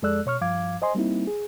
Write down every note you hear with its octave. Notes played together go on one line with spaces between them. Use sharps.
F2 G#3 A4 D5 E6 F#6
B2 C#5 C#6 F6
G2 F3 F5 D6 G#6
C5 D#5 G#5 C6
G3 A#3 C4 D#4 E4
G#4